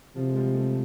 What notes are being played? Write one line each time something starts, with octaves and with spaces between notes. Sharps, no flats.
C3 F3
G#3
F3 G3
G3 A3